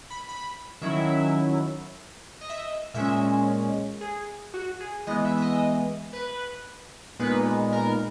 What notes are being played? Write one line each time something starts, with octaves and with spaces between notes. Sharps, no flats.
B5
B5
D#3 F#3 C#4 E4 E5
D#5
E5
D#5
A#2 G#3 C#4 E5
G#4
F#4
G#4
E3 G#3 B3 D#5
E5
E5
D#5
B4
A#2 G#3 B3 D#4 B4
A#4